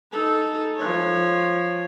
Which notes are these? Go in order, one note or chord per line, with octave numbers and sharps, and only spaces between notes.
D#4 A4
F3 C#5